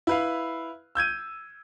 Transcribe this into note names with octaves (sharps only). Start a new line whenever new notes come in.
E4 B4 F5
E6 G6 G#6 D#7